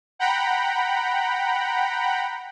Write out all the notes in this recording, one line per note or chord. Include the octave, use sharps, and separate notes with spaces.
F#5 G5 A#5 B5